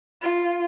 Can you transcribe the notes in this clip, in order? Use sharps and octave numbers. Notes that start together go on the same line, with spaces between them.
F4